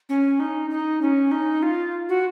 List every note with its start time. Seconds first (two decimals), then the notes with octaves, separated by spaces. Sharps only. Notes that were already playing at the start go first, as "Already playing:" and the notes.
0.09 C#4
0.40 D#4
0.70 D#4
1.01 C#4
1.31 D#4
1.63 F4
2.09 F#4